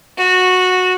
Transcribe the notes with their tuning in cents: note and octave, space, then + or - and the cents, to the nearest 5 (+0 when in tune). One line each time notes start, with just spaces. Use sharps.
F#4 -10